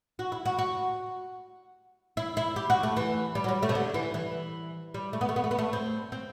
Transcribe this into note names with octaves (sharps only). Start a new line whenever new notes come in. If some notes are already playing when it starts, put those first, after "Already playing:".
F#4
E4
F#4
F#4
E4
E4
G4
F#4
A3
E3
G3
F#3
G3
A3
C3
D3
E3
E3
G3
A3
B3
A3
B3
A3
B3
A3
C4
C4